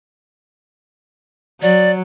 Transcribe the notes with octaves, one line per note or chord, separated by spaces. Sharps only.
F#3 D5